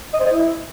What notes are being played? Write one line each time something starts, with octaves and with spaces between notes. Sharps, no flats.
D#5
C5
D#5
E4